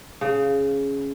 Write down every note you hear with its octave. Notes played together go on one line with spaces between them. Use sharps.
C#3